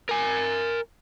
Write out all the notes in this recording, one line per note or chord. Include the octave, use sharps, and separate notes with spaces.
A#4 G#5